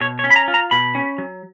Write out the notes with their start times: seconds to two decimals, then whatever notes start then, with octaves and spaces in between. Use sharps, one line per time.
0.01 B2 C#5
0.19 C#5
0.24 C#4
0.30 B5
0.36 A#5
0.48 F4
0.54 A#5
0.71 B2 B5
0.95 C#4
1.18 F#3